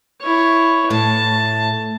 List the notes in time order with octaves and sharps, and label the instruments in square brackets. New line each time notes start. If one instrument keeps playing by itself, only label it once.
[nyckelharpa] E4 C#5
[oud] A2 [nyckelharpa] A5